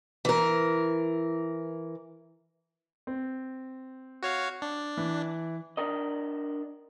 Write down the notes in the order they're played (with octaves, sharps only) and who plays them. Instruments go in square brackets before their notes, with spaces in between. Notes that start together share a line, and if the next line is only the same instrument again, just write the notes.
[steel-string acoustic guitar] E3 A#4
[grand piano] C4
[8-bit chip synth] F#4 C#5 F5
D4
[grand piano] E3
[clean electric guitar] D4 A#4 D#5